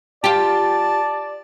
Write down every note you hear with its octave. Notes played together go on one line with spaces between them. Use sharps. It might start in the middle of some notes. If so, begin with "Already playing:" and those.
F4 G4 D5 A5